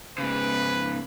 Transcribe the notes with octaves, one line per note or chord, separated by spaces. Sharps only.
G#2 C#3 B4